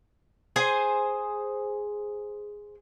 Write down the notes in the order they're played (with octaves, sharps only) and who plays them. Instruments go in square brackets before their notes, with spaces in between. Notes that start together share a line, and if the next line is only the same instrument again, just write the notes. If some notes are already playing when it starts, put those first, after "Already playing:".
[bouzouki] G#4 C5 G#5